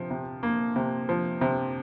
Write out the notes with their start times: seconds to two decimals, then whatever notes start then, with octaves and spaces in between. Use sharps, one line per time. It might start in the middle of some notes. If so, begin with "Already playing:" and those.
Already playing: C3 F3
0.10 C3
0.43 A#3
0.76 C3
1.09 F3
1.41 C3